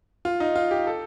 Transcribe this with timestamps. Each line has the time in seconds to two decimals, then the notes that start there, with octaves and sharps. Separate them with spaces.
0.25 F4
0.40 D#4
0.56 F4
0.71 G4
0.87 A4